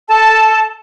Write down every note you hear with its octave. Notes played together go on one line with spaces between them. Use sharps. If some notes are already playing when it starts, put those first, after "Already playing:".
A4 A5